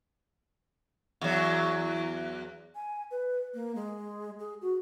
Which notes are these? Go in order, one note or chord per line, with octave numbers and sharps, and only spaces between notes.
E2 F#3
G#5
B4
A#3
G#3
G#4
F#4